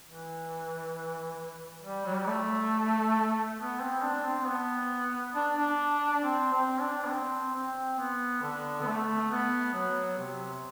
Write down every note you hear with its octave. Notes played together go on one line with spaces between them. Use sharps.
E3
G3
F#3
G3
A3
B3
C4
D4
C4
B3
D4
D4
C4
C4
D4
B3
C4
C4
B3
D3
B3
A3
B3
F#3
C3